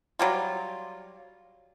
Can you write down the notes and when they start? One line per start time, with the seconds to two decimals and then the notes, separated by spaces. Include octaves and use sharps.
0.19 F#3 G3 F4